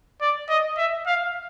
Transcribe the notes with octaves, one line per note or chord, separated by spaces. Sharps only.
D5
D#5
E5
F5